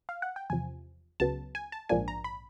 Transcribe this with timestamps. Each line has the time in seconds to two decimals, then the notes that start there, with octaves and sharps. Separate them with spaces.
0.09 F5
0.22 F#5
0.36 G5
0.50 E2 C3 F3 G#5
1.20 C#2 C#3 F#3 B3 A5
1.55 G#5
1.72 A5
1.89 A#1 G#2 F3 A#3 D4 G#5
2.08 A#5
2.24 B5